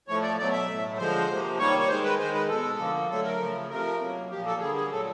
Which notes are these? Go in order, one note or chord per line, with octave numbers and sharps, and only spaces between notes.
A2 F3 A3 C#5
D5
B2 F#3 A3 D5
E5
A2 F#3 A3
D3 F3 G#3 C5
C3 F3 A#3
D#3 G3 A#3 C#5
C#5
D#3 G#3 C5
B4
D#3 G#3 C5
B4
B2 G#3 A4
D3 F3 A#3
D3 F#3 A3 A4
A#4
C#3 F3 A3
C3 F3 A3 A#4
B2 F#3 A#3
A#2 F3 A#3 G4
A4
D3 G3 A#3 G#4
G#4
A#2 F#3 A3 A4